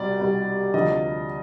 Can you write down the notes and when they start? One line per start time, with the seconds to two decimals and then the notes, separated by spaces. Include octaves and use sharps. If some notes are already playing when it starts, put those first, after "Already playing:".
Already playing: C2 B2 G3 D5
0.19 C2 B2 G3
0.74 D2 C3 F3 D#5